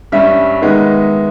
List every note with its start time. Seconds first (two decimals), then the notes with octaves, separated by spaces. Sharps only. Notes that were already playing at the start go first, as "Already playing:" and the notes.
0.12 G2 G3 C#4 E5
0.62 D#3 G#3 B3 D#4